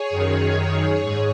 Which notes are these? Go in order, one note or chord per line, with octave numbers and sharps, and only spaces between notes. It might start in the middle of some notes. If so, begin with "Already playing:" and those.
Already playing: G#4 C#5
F#2 D#3
G#2